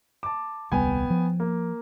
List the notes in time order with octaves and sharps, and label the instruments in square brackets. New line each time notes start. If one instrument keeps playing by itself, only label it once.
[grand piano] A5 D6
[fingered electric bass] D#1 C2 G3 [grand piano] B3 G5 G#5
[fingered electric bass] F3
[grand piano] A#3